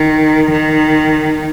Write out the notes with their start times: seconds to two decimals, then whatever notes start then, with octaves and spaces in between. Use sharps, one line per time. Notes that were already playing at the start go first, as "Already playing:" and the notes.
Already playing: D#3
0.52 D#3